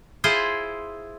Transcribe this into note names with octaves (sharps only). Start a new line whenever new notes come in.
E4 F4 G#4 C5